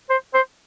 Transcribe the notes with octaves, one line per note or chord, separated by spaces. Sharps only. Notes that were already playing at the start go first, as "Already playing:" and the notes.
C5
C5